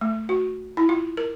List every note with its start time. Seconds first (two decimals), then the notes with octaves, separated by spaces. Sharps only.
0.01 A3
0.29 F#4
0.77 E4
0.89 F4
1.17 A#4